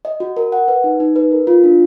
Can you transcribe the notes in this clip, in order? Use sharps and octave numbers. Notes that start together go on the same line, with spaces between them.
D#5
F#4
A#4
F#5
B4
D#4
D#4
B4
A#4
F4
D4